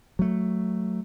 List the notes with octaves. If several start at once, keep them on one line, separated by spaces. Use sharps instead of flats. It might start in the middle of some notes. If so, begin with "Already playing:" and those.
F#3 A3